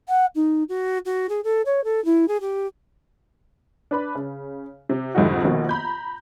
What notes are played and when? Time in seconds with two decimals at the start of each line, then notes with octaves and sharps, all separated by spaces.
0.08 F#5
0.35 D#4
0.68 F#4
1.05 F#4
1.29 G#4
1.44 A4
1.65 C#5
1.84 A4
2.05 E4
2.28 G#4
2.40 G4
3.91 D4 B4 B5
4.15 C#3
4.89 C3
5.15 C2 F2 G#2 D3 D#4 F#4
5.44 A#1 B2 D#3 A#3 F#4
5.69 A#5 B5 G6